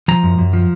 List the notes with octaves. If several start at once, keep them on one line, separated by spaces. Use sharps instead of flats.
F3 A#5
F#2
F#2
F3